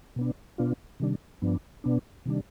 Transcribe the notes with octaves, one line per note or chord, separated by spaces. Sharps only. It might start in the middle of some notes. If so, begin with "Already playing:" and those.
B2 B3 D4
B2 B3 D4 F4
C3 D#3 G3 D4
G2 F3 B3 D4
B2 B3 D4
C3 D#3 G3 D4